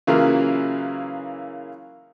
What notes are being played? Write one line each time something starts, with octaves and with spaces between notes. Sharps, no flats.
C#3 E3 F#3 A#3 F4